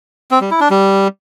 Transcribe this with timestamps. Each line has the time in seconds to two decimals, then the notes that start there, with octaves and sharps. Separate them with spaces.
0.31 C4
0.41 G3
0.51 E4
0.60 D4
0.70 G3